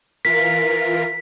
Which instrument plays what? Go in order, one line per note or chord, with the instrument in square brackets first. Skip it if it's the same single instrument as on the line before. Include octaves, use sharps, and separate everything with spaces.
[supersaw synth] E3 F4 A#4 [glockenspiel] B6